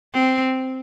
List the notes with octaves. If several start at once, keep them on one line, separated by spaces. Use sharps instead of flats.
C4